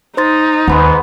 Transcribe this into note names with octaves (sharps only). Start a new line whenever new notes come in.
D#4 C5 C6 A6
D#2 G#2 B3 F#5 B5 C6